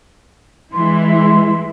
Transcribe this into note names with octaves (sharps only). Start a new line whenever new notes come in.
E3 G#3 E4 C6